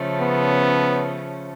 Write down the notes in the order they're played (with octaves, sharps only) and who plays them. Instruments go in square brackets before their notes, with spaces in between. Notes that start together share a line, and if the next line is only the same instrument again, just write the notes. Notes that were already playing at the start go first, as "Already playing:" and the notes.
Already playing: [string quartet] C#3 F3 A3 C#4
[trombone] B3